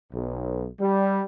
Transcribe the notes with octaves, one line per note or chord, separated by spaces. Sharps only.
B1
G3